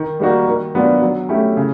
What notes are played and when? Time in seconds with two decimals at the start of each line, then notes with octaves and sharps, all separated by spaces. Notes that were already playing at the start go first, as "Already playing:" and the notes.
Already playing: D#3
0.20 G3 A#3 D#4 F#4
0.48 D#3
0.75 F#3 B3 D4 F4
1.02 F#3
1.29 A3 C#4 E4 G4
1.57 C#3